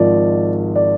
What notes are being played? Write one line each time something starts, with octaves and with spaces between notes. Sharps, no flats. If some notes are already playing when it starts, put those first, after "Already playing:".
Already playing: G#1 G#2 F3 D5
D5